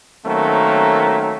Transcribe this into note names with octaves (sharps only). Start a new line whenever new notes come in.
D#3 F#3 A3 A#3 C4 C#4